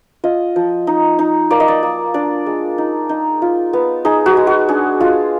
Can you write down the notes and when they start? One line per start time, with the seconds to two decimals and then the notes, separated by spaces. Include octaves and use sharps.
0.24 F4 D#5
0.56 F3
0.87 D#4
1.19 D#4
1.50 A#3 D5
1.60 D#5
1.68 D5
1.83 A#3
2.14 D4 D5
2.46 G#3
2.78 D#4
3.09 D#4
3.42 F4
3.73 B3
4.05 D#4 G#4
4.26 F#4
4.37 G#3
4.47 F#4
4.68 D4 G#4
5.00 G#3 F4